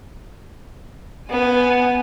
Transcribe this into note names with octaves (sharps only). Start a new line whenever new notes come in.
B3 G#5